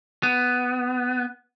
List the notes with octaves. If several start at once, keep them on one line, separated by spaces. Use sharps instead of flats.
B3